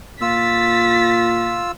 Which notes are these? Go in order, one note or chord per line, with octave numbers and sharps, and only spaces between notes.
A#2 F4 E6 A6 B6